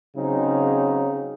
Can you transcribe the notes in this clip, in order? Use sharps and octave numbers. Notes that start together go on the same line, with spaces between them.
C#3 F#3 C4 D#4